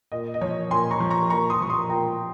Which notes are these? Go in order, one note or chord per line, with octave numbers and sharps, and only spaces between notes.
A#2 D#5
D#5
F3 C#5
A#2 G#5 C6
A#5 C#6
F3
A#5 C#6
A#2 A#5 C#6
C6 D#6
F3 C#6
C6 D#6
A#2 G5 A#5